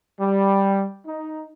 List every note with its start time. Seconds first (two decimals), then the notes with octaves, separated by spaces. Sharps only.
0.21 G3
1.06 D#4